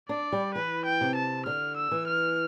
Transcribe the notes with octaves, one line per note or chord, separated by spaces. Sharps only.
D4 D5
G3
E3 B4
G5
C3
A5
D3 F6
E6
E3
F6